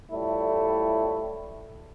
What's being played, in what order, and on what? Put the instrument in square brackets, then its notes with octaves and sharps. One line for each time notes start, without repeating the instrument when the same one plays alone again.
[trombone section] A2 F3 G3 A3 E4